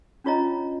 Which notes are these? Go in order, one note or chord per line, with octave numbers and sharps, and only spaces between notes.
C#4 D4 F4 C#5 D#5 A#5